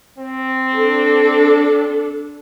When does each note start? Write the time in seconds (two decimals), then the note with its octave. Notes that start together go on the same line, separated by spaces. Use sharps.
0.18 C4
0.75 D4 A4